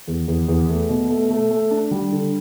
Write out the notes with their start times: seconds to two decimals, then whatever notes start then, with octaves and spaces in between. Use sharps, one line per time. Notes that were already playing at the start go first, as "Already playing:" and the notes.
0.08 E2
0.28 E2
0.48 E2
0.69 A3
0.89 B2
1.10 A3
1.30 A3
1.51 A3
1.71 D4
1.91 G3
2.12 D3